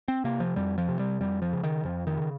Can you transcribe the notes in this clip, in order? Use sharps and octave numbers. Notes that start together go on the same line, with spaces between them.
C4
C3 A#3
F3
F2 G3
F3
C3
G3
F2 G3
F3
C#3
D#3
F2 F3
D#3
C#3